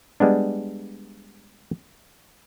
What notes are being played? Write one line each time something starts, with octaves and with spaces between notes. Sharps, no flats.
G3 G#3 B3 D4